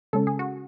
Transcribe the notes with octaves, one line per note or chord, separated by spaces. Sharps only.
C#3 G#3 C#4 A4
G#4
F#4